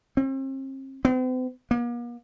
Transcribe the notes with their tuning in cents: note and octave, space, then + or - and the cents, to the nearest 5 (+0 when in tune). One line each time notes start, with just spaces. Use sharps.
C4 +40
C4 -45
A#3 +45